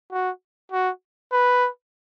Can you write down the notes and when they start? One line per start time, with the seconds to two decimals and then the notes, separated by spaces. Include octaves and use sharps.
0.12 F#4
0.72 F#4
1.33 B4